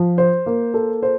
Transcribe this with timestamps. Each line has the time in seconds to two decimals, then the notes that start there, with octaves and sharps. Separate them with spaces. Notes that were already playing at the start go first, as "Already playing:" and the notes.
Already playing: F3
0.18 C5
0.46 A#3
0.74 A4
1.03 C5